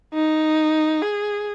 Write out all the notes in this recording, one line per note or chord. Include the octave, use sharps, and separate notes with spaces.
D#4
G#4